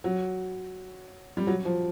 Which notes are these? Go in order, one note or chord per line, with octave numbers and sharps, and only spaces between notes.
F#3
G3
F#3
F3